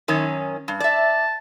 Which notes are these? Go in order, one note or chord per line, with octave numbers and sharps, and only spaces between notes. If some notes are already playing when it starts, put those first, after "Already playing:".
F#2 D#3 C#4
G2
D5 E5 A5